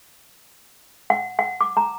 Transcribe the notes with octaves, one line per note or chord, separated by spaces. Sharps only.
F#5
F#5
D6
A#5